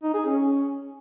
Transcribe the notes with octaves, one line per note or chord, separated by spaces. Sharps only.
D#4
G#4
C#4